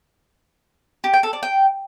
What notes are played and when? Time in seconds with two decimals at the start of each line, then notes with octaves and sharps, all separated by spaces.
1.04 G4
1.14 G5
1.23 A4
1.33 D5
1.43 G5